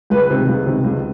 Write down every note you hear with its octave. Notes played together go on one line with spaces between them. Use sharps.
C#2 B4
C3 D#3
C#2
C3 D#3
C#2